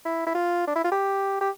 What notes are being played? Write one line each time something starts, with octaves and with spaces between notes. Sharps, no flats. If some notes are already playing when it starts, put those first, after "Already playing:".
E4
E4
F4
D4
E4
F4
G4
G4